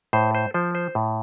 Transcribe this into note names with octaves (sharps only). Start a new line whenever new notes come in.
A2 C5
C5
F3 C5
C5
A2